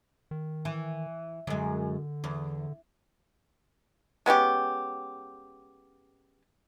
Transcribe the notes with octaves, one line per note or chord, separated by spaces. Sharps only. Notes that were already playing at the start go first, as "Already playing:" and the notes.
D#3
E3
F#2 D3 G#3
E2
G#3 B3 C#4 G4